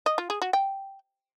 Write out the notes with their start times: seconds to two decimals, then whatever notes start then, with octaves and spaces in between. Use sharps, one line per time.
0.06 D#5
0.18 F4
0.30 G#4
0.42 F#4
0.53 G5